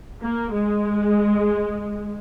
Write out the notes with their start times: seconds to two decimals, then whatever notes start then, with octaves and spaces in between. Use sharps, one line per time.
0.22 A#3
0.52 G#3